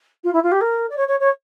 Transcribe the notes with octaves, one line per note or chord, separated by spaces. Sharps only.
F4
E4
F4
G4
A#4
D5
C#5
C#5
C#5